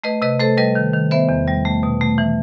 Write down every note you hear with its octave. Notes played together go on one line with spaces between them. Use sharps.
A3 B4 D#5
C3 B4 D#5
A3 A4 C5
G3 B4 D#5
D#3
D#3
B3 C5 E5
E2
G3
A3
B2
A3
E3